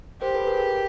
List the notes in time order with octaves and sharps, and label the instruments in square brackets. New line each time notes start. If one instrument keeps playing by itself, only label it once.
[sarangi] G4 [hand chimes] A#4 C5
[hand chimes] A4 B4
G#4 A#4
G#4 A#4